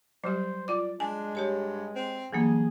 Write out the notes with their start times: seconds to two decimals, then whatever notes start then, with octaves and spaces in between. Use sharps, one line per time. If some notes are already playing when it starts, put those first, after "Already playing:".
0.24 F#3 G3 G4 C5
0.68 F4 D5 D6
1.00 G#3 D4 G#5
1.35 G2 G4 C#5 A5
1.95 C4
2.33 G2 E3 F#3 A#3 G#4